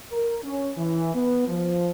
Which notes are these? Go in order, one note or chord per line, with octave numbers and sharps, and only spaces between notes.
A#4
C#4
E3
B3
F3